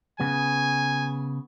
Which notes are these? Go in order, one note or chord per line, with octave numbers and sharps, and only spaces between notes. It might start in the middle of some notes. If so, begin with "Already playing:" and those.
C#3 B3 G#5